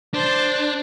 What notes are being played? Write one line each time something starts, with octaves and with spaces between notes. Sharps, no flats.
D4 C5 A5